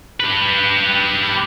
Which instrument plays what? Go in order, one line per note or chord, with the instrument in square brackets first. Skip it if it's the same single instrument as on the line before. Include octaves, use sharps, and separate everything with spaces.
[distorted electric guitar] G4 B4